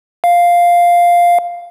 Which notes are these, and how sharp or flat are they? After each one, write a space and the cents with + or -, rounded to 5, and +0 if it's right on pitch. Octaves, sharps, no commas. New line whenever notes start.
F5 +0